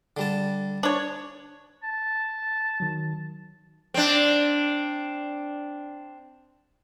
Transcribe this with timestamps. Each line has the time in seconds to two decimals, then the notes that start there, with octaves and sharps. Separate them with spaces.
0.17 D3 G3 A5
0.83 D4 C#5
1.83 A5
2.80 D#3 F#3
3.94 C4 D4